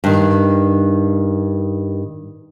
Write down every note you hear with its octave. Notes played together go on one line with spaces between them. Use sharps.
G2 D#3